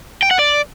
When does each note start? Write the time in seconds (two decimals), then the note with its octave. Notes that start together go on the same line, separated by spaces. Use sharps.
0.23 G5
0.31 F#5
0.39 D5